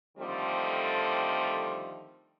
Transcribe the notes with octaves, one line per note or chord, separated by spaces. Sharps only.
D3 D#3 F3 G3 A3 C4